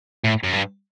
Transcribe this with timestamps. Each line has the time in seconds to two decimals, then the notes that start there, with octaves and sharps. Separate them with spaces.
0.24 A2
0.43 F#2
0.53 G2